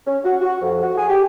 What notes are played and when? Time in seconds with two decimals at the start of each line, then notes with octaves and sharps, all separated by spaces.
0.07 C#4
0.24 F#4
0.41 F#4
0.61 F2
0.83 F#4
0.98 G#4
1.09 G4